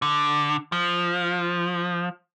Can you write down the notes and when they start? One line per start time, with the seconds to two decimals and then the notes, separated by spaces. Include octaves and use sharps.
0.02 D3
0.72 F3